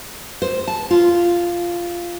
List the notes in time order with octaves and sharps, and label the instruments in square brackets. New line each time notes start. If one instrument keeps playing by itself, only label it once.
[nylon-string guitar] C5
A5
F4